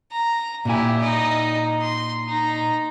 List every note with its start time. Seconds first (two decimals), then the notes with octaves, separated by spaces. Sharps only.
0.12 A#5
0.65 A#2 E4 G4 G#5
1.01 D#4 D#5
1.81 C6
2.27 D#4 A#5